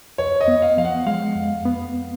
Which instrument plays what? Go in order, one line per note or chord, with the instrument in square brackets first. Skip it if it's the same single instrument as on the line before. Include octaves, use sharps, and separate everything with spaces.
[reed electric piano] F2 [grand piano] C#5
[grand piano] D#5
[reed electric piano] B3
[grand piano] F5
[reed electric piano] F3 [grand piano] F5
[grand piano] F#5
[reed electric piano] G#3 [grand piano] F5
[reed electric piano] F2
B3